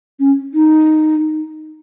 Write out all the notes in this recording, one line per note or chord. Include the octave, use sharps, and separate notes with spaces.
C#4
D#4